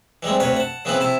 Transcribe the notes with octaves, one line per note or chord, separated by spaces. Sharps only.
E3 G3 G#3 C4
D2 C3 B4 C#5 F5
F#5 A5
C#3 E3 B3 C4 E4 B4
C3 E4 A5